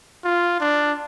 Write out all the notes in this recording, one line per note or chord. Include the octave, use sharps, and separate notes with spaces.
F4
D4